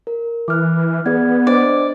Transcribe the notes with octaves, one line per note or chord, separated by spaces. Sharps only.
A#4
E3 D6 F6 F#6
B3 G#4 D5 G#6
D4 C5 D5 D#5